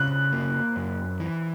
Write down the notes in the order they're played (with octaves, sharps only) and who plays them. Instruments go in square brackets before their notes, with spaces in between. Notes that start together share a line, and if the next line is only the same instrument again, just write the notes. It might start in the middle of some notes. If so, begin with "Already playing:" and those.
Already playing: [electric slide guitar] C#3 [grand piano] F#6
[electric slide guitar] A#3
F#2
E3